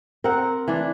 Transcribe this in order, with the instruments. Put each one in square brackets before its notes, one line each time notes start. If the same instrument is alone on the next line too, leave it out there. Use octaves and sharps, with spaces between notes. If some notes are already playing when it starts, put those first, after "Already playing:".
[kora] C4 F#5 [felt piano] A#4
[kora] E3 D4